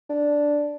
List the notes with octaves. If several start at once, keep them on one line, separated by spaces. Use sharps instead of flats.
D4